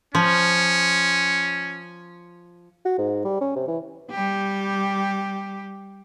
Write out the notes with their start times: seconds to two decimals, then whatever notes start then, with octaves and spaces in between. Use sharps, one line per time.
0.15 F3 C#4
2.86 F#4
2.98 G#2
3.25 G3
3.41 C#4
3.56 C3
3.68 E3
4.10 G3 G4